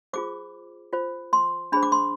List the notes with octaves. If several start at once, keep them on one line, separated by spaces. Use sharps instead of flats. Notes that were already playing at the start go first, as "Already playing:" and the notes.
F4 G#4 C5 D6
F4 C5
C6
D4 G#4 C5 B5
D6
C6